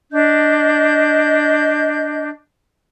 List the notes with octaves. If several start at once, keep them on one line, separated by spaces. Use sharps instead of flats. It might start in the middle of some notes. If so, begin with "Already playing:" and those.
D4 D#5 G6